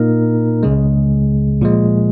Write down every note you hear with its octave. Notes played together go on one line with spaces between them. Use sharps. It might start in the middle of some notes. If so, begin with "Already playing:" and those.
Already playing: A#2 A#3 D#4 A#4
C#2 C#3 G#3
A#2 F3 G#3